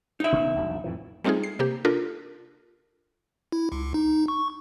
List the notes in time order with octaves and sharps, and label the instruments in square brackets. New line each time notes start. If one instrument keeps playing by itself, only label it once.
[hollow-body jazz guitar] D#4 E5
[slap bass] E1 C#3 B3
E1 A#1 F#3
F2 A2 E3
[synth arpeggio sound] G3 A3 C4 D#4 F4 G#4
C7
C3 A#3 G4
D4 F4 A4 A#4
[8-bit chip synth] E4
C#2
D#4
C#6